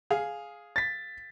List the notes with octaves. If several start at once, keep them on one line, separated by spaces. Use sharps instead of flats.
G#4 F5
A6 B6